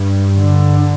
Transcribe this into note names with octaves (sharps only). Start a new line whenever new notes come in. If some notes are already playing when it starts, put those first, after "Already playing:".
Already playing: G2
D3